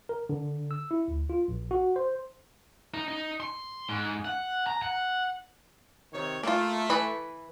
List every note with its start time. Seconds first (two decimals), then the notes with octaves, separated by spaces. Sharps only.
0.09 A#4
0.29 D3
0.71 E6
0.91 E4
1.08 D2
1.30 F4
1.48 A#1
1.71 F#4
1.96 C5
2.94 D#4
3.08 D#4
3.40 C6
3.89 G#2
4.25 F#5
4.67 A#5
4.82 F#5
6.13 C3 D#3 C#5
6.43 A3 A#3 F4
6.90 E3 B4 B5